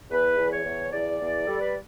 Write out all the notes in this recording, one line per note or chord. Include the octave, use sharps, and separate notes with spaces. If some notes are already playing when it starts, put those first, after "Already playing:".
E2 B4
E2
C#5
E2
E2 D5
E2
G3 A4
B4